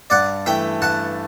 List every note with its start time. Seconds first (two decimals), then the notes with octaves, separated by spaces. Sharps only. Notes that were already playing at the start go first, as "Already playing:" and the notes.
0.10 G2 D5 F#5
0.46 E3 A3 E5 G5
0.81 G2 F#5 A5